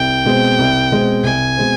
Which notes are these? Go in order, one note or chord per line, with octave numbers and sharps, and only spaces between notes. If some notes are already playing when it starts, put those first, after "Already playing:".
Already playing: C2 G5
B2 G#3 C4
C2
B2 G#3 C4
C2 G#5
B2 G#3 C4